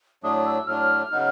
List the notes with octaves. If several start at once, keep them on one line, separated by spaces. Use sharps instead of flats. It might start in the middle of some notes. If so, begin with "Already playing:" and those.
A2 F#3 A3 D4 D#6
E6
A2 F#3 A3 D4 F6
C#3 F#3 B3 D#4